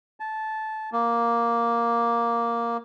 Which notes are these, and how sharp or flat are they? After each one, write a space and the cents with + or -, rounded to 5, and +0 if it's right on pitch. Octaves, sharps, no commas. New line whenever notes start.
A5 -15
A#3 +5